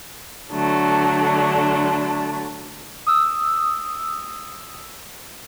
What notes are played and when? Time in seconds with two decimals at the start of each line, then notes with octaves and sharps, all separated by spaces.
0.52 D3 F#3 A3 D4
3.06 D#6 E6